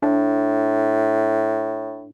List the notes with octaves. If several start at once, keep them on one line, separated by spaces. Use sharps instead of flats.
A2 D4